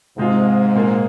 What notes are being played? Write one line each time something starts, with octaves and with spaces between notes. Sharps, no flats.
G#2 C3 G#3 F4
A#2 A#3 F4 G#4